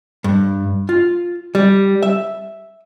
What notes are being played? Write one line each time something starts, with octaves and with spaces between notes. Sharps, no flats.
G2
F4
G3
E5